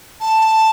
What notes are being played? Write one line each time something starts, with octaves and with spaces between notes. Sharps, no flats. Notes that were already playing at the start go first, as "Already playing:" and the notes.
A5